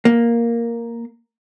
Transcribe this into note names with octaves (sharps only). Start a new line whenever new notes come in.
A#3